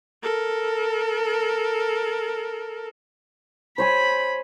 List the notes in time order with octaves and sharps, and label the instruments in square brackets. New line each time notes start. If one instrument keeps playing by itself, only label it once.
[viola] A4 A#4
[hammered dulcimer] C5 C#5 G#5 [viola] B5